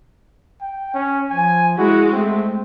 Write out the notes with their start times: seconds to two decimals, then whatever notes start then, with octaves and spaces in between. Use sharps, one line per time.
0.61 G5
0.94 C#4
1.31 F3 G#5
1.78 G#3 E4 F#4
2.13 A3 C4